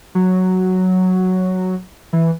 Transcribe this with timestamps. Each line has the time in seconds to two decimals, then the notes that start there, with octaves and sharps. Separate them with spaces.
0.15 F#3
2.13 E3